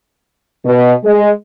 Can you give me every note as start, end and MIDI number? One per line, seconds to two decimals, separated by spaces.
0.65 0.92 47
1.05 1.30 56